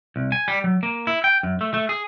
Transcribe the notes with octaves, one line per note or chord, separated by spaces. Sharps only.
C2
G#5
G3
F#3
A#3
E4
G5
F#2
A3
A3
G#4